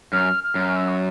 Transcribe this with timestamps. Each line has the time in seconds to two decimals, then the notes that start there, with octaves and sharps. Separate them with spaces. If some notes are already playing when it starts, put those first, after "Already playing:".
0.13 F#2 F6
0.44 F6
0.55 F#2
0.76 E6
0.88 C#6